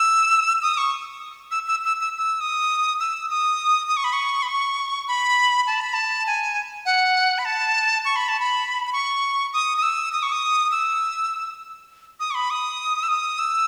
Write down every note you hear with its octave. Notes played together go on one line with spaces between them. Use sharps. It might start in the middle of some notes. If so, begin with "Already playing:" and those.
Already playing: E6
D#6
C#6
E6
E6
E6
E6
E6
D#6
E6
D#6
D#6
C#6
B5
C#6
B5
C#6
B5
A5
B5
A5
G#5
F#5
B5
A5
C#6
B5
A5
B5
B5
C#6
D#6
D#6
E6
D#6
C#6
D#6
E6
D#6
C#6
B5
D#6
E6
D#6
E6